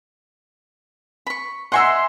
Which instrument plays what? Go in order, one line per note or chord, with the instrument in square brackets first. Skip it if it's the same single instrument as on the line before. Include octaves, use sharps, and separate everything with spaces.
[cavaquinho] B5 C#6
[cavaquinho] D#5 G#5 A#5 [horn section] E5 C6 [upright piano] F#5 E6